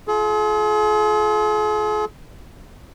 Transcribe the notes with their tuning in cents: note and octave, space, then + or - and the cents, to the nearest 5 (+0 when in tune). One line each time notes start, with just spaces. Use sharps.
F4 +0 G#4 +45